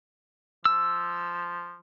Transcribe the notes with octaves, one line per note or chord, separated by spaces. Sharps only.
F3 E6